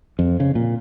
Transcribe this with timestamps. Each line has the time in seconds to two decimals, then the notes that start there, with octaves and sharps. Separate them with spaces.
0.19 F2
0.40 C#3
0.55 A#2